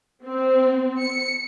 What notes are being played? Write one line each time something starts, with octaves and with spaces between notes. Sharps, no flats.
C4
C#7